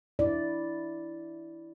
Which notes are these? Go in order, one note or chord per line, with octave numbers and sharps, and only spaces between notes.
E4 D5